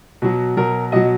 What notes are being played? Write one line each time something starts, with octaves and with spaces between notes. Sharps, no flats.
B2 F#3
B2 F#3 A#4
B2 F#3 D#5